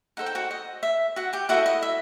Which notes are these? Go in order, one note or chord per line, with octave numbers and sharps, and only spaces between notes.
D#4 A4 C5 F#5
G5
F#4 F#5
D#5
E5
F#4 F#5
G4 G5
E4 F#4 A4 D#5 F#5
D#5
E5